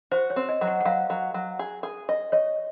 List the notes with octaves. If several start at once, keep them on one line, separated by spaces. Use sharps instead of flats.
F#4 C5
C#5
C4
D#5
F#3
F#5
F#5
F#3 F5
F#3
F#3
G#4
G#4
D#5
C#5 D#5